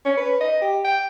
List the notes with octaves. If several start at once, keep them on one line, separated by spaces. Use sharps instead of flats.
C#4
B4
D#5
G4
G5